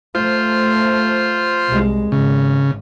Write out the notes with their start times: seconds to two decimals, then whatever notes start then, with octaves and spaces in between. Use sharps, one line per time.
0.15 F3 A3 F4 C5
1.68 C2 G#3
2.12 G#1 C#3